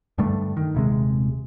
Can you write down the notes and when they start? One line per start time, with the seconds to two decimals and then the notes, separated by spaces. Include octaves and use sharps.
0.18 G2 D3 G3 A3
0.57 D#3
0.75 D#1 C3 G#3